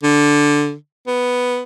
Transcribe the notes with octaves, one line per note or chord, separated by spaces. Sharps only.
D3
B3